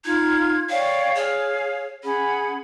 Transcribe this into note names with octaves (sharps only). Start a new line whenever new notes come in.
D#4 F4 G#6
C#5 D5 F5 G5
G#4 C#5 F5
C#4 G#4 F#5 B5